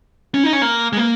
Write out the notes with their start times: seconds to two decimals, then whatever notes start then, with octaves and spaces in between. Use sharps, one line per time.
0.34 C#4
0.44 D#4
0.53 C#4
0.62 A#3
0.93 G#3
0.97 A#3